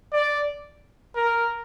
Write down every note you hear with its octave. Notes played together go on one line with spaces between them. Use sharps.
D5
A#4